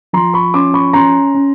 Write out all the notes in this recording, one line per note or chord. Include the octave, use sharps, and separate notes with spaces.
F3 A#5 C6
B5 C#6
C#4 C6 D6
B5 C#6
C#4 A#5 C6
C#4